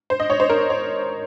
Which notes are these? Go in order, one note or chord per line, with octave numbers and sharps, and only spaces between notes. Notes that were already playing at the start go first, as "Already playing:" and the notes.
C5
D#5
C#5
C5
A#4
C#5